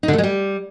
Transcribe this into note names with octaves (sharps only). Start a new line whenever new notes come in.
D#4
D3
A3
G#3
G3